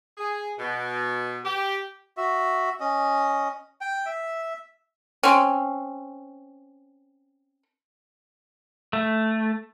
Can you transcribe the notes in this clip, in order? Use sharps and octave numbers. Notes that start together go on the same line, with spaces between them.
G#4
B2
G4
F#4 E5
C#4 D#5
G5
E5
C4 C#4
A3